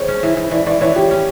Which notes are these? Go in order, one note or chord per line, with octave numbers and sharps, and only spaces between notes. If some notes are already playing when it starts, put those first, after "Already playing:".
Already playing: G#3 C5 C#5
C#4
E3
E3
E3 D5
E3 D5
E3 C#5
E3 G4
C#4